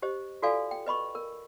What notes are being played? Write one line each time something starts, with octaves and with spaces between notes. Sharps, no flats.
G4 C5 D#5
F4 F#4 A4 D5 F5 G#5
G5
B4 D#5 B5 C#6
A#4